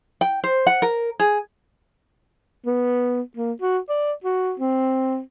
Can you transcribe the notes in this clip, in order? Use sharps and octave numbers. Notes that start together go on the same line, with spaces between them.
G5
C5
F#5
A#4
G#4
B3
A#3
F#4
D5
F#4
C4